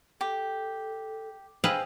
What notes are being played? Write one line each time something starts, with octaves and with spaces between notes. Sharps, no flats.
G4 A4
G#4 B4 C5 D#5 F5 G5 E6